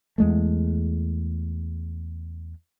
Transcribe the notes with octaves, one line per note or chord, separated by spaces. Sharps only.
E2 G#3 A3